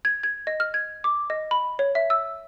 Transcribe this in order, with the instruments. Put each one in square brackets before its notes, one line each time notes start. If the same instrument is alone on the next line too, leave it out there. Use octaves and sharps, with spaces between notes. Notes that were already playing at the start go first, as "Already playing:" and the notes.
[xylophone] G#6
G#6
D#5
F6
G#6
D6
D#5
B5
C#5
E5
E6